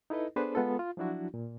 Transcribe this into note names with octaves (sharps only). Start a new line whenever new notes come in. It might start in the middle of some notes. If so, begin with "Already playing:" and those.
D#4 E4 A4 B4 D#5
B3 D4 G#4 A4 B4 C5
G#3 B3 F4 A4
F4
F3 F#3 D4 E4 F#4
A#2